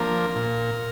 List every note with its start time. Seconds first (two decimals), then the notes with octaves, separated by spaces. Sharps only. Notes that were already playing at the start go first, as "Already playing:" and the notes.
Already playing: F3 A#3 D4 A#4
0.36 A#2